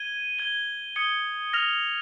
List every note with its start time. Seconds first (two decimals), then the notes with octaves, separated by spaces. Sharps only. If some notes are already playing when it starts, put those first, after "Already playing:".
Already playing: G#6 D#7 G7
0.38 G#6 D#7 G7
0.96 D#6 G#6 C#7 G7
1.53 F6 A#6 F7